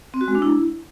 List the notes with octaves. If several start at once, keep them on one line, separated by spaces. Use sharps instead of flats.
C4
F#4
G#3
D4
E4